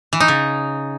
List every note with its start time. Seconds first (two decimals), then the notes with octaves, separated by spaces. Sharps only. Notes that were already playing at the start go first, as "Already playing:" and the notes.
0.13 E3
0.20 D#4
0.28 C#3